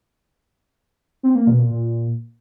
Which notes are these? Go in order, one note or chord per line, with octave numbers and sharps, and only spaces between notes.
C4
A#3
B2
A#2
A#2